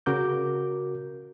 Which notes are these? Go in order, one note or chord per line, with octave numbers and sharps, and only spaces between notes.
C#3 F#4 A#4 D6 G6